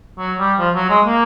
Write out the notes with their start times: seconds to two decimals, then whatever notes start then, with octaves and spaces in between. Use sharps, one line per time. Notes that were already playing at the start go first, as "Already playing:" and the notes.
0.19 F#3
0.39 G3
0.59 F3
0.75 F#3
0.89 G#3
1.05 A#3